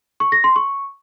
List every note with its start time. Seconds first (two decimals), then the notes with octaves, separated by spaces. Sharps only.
0.20 C#6
0.32 A#6
0.44 C6
0.56 C#6